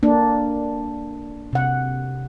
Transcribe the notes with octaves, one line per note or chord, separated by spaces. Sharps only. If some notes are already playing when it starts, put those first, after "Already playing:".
A#3 D4
C3 F#5